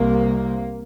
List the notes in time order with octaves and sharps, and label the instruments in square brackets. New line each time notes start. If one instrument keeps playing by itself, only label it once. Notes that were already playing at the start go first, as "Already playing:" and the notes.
Already playing: [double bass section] C2 C3 A#3